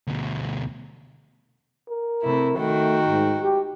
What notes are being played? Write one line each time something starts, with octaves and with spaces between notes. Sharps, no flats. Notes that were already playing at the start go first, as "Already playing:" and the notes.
D2 B2
A#4
C3 A3 E4
D#3 A3 F#4 G5
G#2
G4